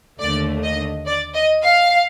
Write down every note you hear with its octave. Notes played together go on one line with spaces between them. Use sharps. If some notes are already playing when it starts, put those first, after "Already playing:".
D#2 D3 A3 D5
D#5
D5
D#5
F5